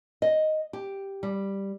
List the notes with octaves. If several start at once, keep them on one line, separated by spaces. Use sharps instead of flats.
D#5
G4
G3